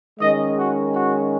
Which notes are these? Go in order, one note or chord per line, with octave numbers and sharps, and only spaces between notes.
D#3 G#3 C#4 D#5
F#4
F#4